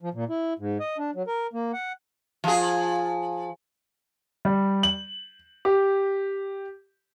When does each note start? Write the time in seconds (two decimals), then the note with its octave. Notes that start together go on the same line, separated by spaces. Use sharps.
0.01 F3
0.14 A#2
0.29 E4
0.59 G#2
0.80 D#5
0.98 D4
1.15 F#3
1.27 A#4
1.53 A#3
1.73 F#5
2.44 F3 G#4
4.45 G3
4.83 F#7
5.65 G4